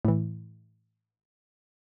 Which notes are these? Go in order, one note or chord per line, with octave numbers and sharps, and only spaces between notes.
A2 E3